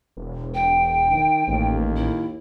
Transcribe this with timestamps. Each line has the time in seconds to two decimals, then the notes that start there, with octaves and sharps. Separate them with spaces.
0.17 E1
0.54 G5
1.12 D#3
1.47 A1 D#2
1.96 E4